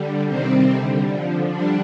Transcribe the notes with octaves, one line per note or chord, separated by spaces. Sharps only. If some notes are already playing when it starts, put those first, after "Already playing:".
Already playing: D3 G3
C3 D#3 G3 C4
D3 G3
D3 F3
D3 G3 D4